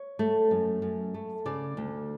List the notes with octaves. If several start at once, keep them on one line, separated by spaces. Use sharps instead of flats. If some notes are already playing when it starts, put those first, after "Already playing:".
Already playing: C#5
A3
F#2
F#2
A3
C#3 D5
D2